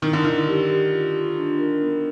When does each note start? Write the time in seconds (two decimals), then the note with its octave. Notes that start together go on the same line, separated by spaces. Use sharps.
0.02 D#3 E4
0.13 D3
0.24 D#3 E4
0.47 G4
0.69 G4
0.91 F4
1.14 F4
1.36 D4
1.59 A#4
1.82 B3